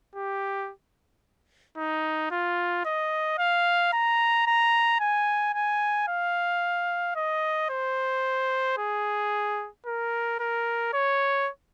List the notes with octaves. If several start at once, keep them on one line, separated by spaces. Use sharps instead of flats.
G4
D#4
F4
D#5
F5
A#5
A#5
G#5
G#5
F5
D#5
C5
G#4
A#4
A#4
C#5